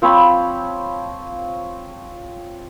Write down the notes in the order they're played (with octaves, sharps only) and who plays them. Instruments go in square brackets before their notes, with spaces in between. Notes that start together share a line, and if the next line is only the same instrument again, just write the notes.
[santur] F3 C4 C#5 B5